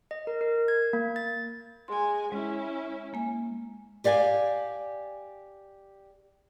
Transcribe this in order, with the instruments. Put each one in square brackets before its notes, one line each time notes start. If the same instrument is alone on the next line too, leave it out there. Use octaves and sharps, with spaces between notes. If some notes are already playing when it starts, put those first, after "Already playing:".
[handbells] D#5
A#4
A#4
G#6
A#3
A6
[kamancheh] G#3 G#5 [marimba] C6
[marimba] G#3 [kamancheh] C#4 E4
[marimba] G#3 A#3 G#5
[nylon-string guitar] G4 D5 F5 G5 G#5